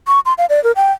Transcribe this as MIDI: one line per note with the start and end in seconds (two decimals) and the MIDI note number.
0.07 0.20 85
0.26 0.33 84
0.38 0.46 77
0.49 0.62 74
0.64 0.72 70
0.76 0.92 79